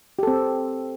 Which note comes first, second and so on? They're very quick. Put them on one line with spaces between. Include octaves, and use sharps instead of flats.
G4 A4 C4